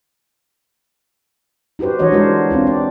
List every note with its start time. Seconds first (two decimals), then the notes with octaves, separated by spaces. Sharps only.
1.79 D#4 F#4 G4 B4 C5
1.99 E3 D4 F#4 C#5 D#5
2.12 G#3 D4 F#4 A#4 C5 C#5
2.50 C4 D4 F4
2.67 D5